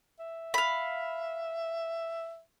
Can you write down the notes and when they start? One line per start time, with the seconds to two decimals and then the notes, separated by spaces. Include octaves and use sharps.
0.19 E5
0.54 F5 B5